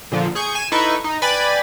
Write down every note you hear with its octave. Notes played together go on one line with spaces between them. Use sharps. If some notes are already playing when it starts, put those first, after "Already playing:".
A#2 D3 F3
G#4 C#6 G6
G#5 E7
D#4 E4 A4 B4 C#6
D#4
B4 D5 G5 G#5 B5 A6